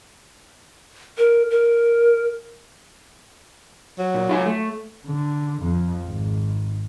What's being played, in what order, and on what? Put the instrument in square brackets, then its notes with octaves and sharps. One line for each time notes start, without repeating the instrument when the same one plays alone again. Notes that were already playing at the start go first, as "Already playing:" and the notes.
[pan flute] A#4
A#4
[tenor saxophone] F#3
[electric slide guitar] A#2
F4 E5 G#5
A3
[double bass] D3
F2
G#1